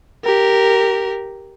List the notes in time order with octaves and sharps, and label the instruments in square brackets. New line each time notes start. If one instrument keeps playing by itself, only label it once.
[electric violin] G4 A#4